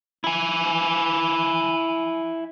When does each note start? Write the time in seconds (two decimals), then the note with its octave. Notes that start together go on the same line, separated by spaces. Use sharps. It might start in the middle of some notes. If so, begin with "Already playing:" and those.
0.24 E4 G#5